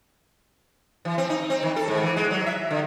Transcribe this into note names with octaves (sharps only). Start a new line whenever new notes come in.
E3
C4
D#4
C4
D#3
A4
G#2
E3
G#3
F#3
E5
D3